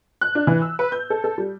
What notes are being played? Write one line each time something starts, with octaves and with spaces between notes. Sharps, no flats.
F#6
D4
E3
E6
B4
G6
A4
A4
G3